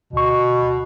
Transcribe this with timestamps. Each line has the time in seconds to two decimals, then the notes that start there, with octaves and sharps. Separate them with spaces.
0.13 D2 B2 C#6